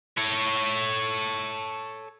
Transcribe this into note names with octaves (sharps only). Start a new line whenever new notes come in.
A4 C#5